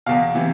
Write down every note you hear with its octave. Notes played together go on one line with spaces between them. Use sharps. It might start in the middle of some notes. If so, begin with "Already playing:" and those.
E2 B2 F5
C3 E3